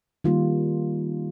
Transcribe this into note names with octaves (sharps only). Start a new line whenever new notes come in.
D#3 G3 A#3 F4